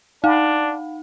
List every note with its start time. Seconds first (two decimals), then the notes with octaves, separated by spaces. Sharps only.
0.24 D4 D#4 F5 F#5 B5